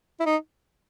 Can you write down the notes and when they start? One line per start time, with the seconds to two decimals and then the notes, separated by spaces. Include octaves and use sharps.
0.20 E4
0.26 D#4